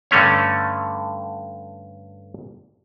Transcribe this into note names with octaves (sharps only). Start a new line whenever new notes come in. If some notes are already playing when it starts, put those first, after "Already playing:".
G2 D3 A3 C#4 C#5